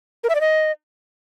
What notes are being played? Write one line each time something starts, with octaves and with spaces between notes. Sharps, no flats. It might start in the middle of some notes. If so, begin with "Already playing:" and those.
A#4
E5
D5
D#5